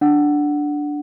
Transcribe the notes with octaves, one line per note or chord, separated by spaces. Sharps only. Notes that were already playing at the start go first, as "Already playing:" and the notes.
D4 F#5